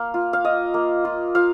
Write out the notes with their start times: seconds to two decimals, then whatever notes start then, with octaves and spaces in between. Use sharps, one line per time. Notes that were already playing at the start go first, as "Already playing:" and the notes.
Already playing: A#3 F5
0.14 F4
0.33 F5
0.44 F4 D#5
0.74 A#3
1.05 F4
1.35 F4 F5